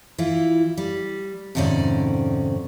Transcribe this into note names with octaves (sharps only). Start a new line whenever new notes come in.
E3 E4 F4
G3
F2 G#2 C3 D#3 C#4 D5